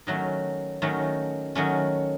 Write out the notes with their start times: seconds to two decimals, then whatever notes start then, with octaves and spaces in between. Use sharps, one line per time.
0.07 D#3 F#3 A3 C#4
0.82 D#3 F#3 A3 C#4
1.55 D#3 F#3 A3 C#4